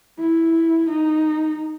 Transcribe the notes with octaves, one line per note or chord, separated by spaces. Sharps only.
E4
D#4